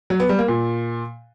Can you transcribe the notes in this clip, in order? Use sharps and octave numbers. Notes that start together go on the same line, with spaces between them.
F#3
B3
G3
A#3
A#2